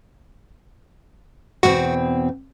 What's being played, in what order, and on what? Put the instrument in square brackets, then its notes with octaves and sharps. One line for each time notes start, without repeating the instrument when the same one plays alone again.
[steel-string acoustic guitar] E2 B2 C4 [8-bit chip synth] F#4